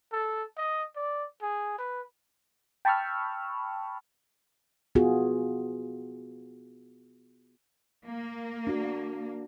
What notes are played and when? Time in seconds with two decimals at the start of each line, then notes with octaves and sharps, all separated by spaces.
0.12 A4
0.58 D#5
0.96 D5
1.42 G#4
1.79 B4
2.85 G5 A5 B5 C#6 E6 F6
4.95 B3 F4 F#4 G#4
8.06 A#3
8.67 D4 F#4